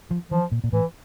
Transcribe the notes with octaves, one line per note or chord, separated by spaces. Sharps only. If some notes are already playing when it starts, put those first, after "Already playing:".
F3
E3 F3
A#2
A#2
A2 E3